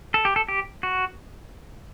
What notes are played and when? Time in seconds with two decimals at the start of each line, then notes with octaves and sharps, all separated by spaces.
0.14 A4
0.25 G4
0.36 A4
0.49 G4
0.83 F#4